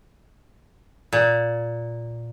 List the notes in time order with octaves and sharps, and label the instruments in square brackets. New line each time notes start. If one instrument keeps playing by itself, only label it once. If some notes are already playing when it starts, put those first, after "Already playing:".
[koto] A#2